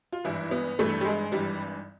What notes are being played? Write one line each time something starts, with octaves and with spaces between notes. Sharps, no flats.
F4
G#1 G2 E3 E4
B3
G#1 G2 E3 A3
G3
G#3
G#1 G2 E3 G3